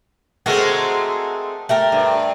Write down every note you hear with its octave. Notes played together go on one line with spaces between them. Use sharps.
G#3 A3 C4 F#4 A#4
A3 G4 A#4
G2